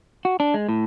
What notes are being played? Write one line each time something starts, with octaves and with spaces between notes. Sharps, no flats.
F#4
D4
G#3
A2